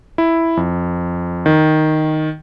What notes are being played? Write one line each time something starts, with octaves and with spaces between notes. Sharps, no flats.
E4
F2
D#3